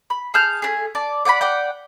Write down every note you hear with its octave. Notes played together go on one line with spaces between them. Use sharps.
B5
G#4 A5 F6 G6
A3 D4 G#4
D5 A5
D5 F#5 G5 B5
D5 F#5 G5